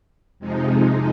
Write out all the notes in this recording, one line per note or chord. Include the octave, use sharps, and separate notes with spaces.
F2 C3 F3 G#3 D#4